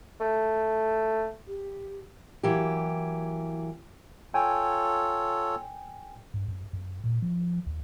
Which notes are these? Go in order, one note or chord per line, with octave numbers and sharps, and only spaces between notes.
A3
G4
E3 F#3 A#3 G4
F4 A4 C#5 G5 G#5
G2
F#2
F#2
A#2
F3
D#2